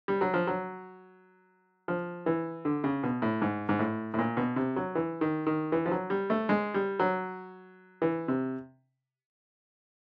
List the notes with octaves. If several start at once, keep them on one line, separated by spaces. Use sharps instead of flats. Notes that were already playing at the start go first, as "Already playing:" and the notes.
G3
F#3
F3
F#3
F3
E3
D3
C#3
B2
A2
G#2
G#2
A2
A2
A#2
B2
C3
F#3
E3
D#3
D#3
E3
F3
F#3
G3
A3
G#3
G3
F#3
E3
C3